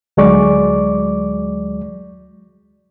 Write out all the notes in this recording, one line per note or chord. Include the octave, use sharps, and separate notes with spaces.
D2 F#3 G#3 D5 C#6 D6